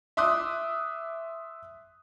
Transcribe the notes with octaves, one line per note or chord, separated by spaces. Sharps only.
E5 C6 D6 D#6 F#6